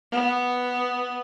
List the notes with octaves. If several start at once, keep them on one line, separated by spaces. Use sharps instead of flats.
B3